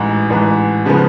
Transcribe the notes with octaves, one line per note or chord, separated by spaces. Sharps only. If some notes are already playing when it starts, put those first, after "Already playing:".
Already playing: A1 G#2 E3
A1 G#2 E3
C#3 F3 G#3 B3